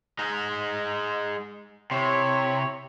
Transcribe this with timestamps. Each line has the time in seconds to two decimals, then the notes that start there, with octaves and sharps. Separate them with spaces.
0.19 G#3 D#4
1.91 C3 E4 C#5